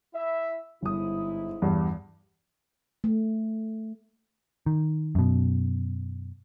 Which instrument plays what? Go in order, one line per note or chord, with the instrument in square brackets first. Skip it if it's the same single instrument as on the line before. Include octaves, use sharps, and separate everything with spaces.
[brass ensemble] E4 E5
[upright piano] G1 D#6 [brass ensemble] G#2 E4
[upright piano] E2 G2
[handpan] A3
[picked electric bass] D#3
F#2 B2